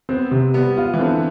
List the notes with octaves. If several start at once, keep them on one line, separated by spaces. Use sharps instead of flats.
B3 C4
C3
G3 B3
F4
E3
D3 C4